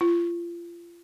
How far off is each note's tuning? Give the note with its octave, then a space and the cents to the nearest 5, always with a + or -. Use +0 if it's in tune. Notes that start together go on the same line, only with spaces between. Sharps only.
F4 -30